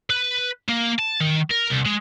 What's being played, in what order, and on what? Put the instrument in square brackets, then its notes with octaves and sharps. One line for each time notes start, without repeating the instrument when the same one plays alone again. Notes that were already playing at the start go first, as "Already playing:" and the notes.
[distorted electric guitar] B4
A#3
A5
D#3
A#4
C2
G#3